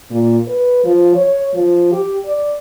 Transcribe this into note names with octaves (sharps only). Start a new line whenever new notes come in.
A#2
B4
F3
C#5
F3
G4
D5